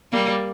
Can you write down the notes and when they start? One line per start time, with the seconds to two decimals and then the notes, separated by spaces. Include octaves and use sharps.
0.12 G3 A#3